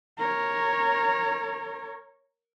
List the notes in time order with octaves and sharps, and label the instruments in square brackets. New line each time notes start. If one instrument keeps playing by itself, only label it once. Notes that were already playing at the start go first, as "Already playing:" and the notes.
[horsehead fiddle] A#4 C#5